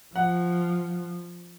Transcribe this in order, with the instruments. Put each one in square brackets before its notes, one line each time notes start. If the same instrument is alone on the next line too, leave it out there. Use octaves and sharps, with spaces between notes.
[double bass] F3 [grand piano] F#5